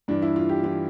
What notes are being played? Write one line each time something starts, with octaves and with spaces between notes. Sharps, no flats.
G2 E3 D4
E4
F4
G4
E3 F4